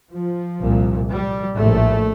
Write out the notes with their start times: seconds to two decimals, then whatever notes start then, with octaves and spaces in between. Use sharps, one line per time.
0.13 F3
0.61 C2 A#2
1.09 G3
1.56 A#1 A2 A3